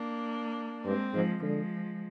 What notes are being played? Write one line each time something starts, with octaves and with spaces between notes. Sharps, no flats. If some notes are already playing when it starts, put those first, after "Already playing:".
Already playing: A#3 D4
G2 G#3 C4
G#2 F3 G#3
D3 F3 G#3